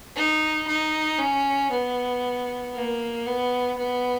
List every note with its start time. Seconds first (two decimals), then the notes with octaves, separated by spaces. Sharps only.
0.16 D#4
0.67 D#4
1.19 C#4
1.71 B3
2.74 A#3
3.26 B3
3.77 B3